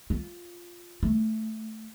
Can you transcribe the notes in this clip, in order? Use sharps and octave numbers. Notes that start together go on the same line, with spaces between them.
F4
A3